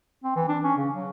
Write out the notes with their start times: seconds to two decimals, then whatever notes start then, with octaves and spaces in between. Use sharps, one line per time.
0.24 C4
0.36 E3
0.49 D4
0.64 C#4
0.77 C#3
0.94 F#3